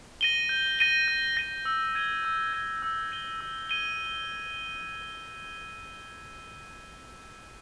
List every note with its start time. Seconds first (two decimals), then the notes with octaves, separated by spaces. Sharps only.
0.21 A#6 D#7 G7
0.49 G6
0.79 A#6 D#7 G7
1.08 G6
1.37 A#6 D#7 G7
1.65 E6
1.95 G#6 D#7 G7
2.25 E6
2.53 G#6 D#7 G7
2.82 E6
3.11 G#6 D#7 G7
3.41 E6
3.69 G#6 D#7 G7